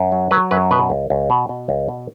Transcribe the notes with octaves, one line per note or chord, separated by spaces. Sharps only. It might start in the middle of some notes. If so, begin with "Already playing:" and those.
Already playing: F#2
F#3
F#3 B4
F#2 B4
B2 B4
C#2
C#2
B2
B2
C#2
B2